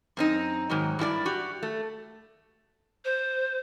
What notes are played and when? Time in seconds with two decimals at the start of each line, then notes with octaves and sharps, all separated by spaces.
0.17 F#2 C4 D#4
0.70 G#2 D#3 F#3
0.99 G2 E4 G4 D5
1.26 F#4 G4
1.63 A3
3.05 C5